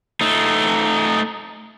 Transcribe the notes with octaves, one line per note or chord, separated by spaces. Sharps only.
A3 D#4